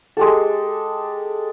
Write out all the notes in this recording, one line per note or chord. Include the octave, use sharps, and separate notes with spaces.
G#3 G4 A4